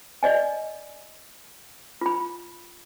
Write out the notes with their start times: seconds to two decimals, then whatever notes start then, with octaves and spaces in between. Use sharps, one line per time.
0.23 D5 D#5 G#5
2.01 F4 B5